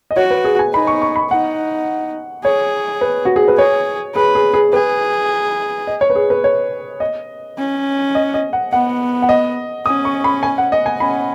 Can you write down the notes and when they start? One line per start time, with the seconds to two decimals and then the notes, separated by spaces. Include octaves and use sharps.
0.11 D#5
0.16 F#4 C#5
0.30 B4
0.44 G#4
0.59 G#5
0.74 D#4 B5
0.87 C#6
1.02 C#6
1.16 B5
1.31 D#4 F#5
2.44 G#4 C#5
3.01 B4
3.25 F#4
3.36 G#4
3.48 B4
3.58 G#4 C#5
4.15 G#4 B4
4.35 G#4
4.54 G#4
4.73 G#4 B4
5.87 D#5
6.01 C#5
6.10 B4
6.15 G#4
6.30 B4
6.44 C#5
7.00 D#5
7.58 C#4
8.15 D#5
8.34 D#5
8.53 F#5
8.73 B3 F#5
9.22 F#5
9.29 D#5
9.86 C#4 D#6
10.05 C#6
10.24 B5
10.43 G#5
10.58 F#5
10.72 D#5
10.86 G#5
11.00 C#4 B5